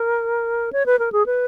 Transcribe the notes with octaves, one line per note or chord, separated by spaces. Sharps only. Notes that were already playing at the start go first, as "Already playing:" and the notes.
Already playing: A#4
C#5
B4
A#4
G#4
B4